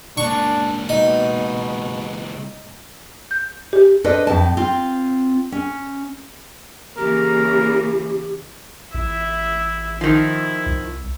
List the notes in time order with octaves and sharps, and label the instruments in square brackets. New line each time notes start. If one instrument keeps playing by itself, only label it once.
[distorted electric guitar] C#2 A#3 [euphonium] D4 [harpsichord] C#6
[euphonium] B2 [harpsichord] D#4
[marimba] G6
G4
[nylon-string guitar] D4 A4 B4 C5 D5 D#5
F2 A2 A5
C4 F4
C#4
[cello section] C#3 E3 A#3 [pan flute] G4 [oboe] A#4
[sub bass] A1 [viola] E4 E5
[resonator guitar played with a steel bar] D#3 F3 [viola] E4
[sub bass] C2